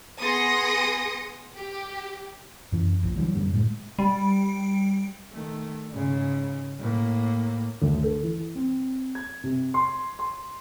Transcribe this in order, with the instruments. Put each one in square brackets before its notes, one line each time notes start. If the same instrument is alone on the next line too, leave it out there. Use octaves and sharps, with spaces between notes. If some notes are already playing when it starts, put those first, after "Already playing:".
[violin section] B3 G#4 C6 D#6 A#6 C#7
G4
[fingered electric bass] F#2 E3
D1 A#1 F3
D3 E3 F#3 G3
F#2 D3 G3
A2 G#3
[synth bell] G3
[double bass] D#3 A3
G#2 C#3
A2 A#3
[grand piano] D2
A4
E3
C4
G#6
C3
C6
C6